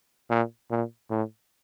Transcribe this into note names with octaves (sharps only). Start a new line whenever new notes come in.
A#2
A#2
A2